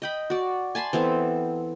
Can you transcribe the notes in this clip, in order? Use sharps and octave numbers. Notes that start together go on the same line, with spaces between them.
D#5 G5 B5
F#4 D5
G#5 A5 B5 C6
E3 B3 C4 A4